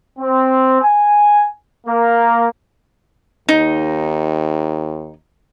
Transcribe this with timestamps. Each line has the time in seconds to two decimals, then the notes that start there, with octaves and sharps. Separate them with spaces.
0.19 C4
0.82 G#5
1.87 A#3
3.49 D#2 D#4